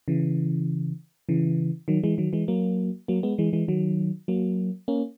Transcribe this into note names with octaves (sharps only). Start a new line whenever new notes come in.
C#3 E3
C#3 E3
D#3 F#3
E3 G#3
D#3 F#3
E3 G#3
F#3 A#3
F#3 A#3
G#3 B3
E3 G#3
E3 G#3
D#3 F#3
F#3 A#3
A#3 C#4